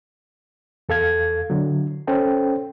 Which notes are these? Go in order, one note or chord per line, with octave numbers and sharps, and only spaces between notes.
E2 A4 F5 G#6
D3 F#3
C#4 A4 C5 G5